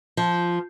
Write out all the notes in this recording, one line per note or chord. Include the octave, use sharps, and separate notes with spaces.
F3